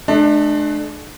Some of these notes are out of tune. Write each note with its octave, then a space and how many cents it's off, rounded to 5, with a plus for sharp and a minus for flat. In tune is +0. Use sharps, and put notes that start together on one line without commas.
A3 -45 D4 +25